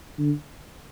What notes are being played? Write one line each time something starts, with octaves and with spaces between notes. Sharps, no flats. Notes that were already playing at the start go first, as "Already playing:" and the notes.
D3